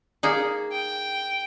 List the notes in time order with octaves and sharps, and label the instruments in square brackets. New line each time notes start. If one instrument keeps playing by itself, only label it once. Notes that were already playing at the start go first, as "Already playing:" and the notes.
[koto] A#3 D#4 G#4
[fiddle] G5